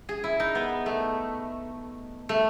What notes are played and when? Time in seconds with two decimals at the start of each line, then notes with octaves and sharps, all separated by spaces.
0.09 G#4
0.24 E4
0.40 D#4
0.55 B3
0.86 A3
2.29 A3